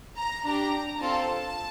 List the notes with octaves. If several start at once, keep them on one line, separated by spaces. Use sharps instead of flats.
A#5
D4 G4 A#5
C4 F4 A4 A5